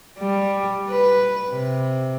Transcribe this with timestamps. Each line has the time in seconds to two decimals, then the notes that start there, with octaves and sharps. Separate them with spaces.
0.19 G3
0.89 B4
1.51 C3